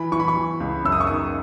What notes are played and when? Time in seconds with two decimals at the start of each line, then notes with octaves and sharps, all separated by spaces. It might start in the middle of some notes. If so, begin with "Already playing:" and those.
Already playing: E3 B5
0.12 E3 C#6
0.20 B5
0.28 C#6
0.36 E3
0.60 C#2
0.84 F#2 E6
0.92 D#6
1.00 C#6
1.07 D#3 D#6